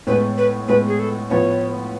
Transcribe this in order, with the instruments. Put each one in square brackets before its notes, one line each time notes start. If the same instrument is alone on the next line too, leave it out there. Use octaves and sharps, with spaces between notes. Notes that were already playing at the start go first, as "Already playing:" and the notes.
[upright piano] A2 G#3 B3 [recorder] B4
[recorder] B4
[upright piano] A2 G#3 B3 [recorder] B4
[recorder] G#4
A4
[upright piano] A2 F3 B3 [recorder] C#5